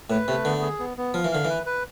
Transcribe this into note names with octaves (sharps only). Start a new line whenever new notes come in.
A2 B4
C3 A3
D3 B3
G#4
B3
B3
F3 F5
E3
D3 F5
E3 B4
B4